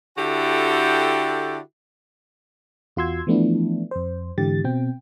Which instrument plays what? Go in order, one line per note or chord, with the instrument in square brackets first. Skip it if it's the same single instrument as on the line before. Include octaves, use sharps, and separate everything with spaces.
[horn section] D3 E4 F#4 G4 A4 G5
[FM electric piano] E2 F4 F#4 C6 E6 G#6
E3 F3 A3 B3 D4 E4
F2 C5
G#2 D3 E3 G4 A6
B2 C4 G5